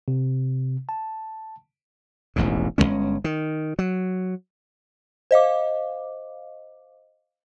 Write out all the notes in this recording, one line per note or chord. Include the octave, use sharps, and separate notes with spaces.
C3
A5
E1 A1 D#2 G#2
G1 G#2 G#3 C#4
D#3
F#3
C5 D#5 F5 D6